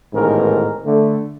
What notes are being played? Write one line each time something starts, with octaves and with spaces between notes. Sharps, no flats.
A1 G#2 B2 D#3 A#4
D3 A3